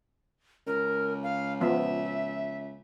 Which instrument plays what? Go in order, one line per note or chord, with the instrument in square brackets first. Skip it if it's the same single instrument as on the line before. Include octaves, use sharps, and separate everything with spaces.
[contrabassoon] C#2 [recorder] A#4
[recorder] F5
[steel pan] F3 B3 [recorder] E5